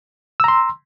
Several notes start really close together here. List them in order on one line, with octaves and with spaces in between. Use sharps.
E6 A#5 C6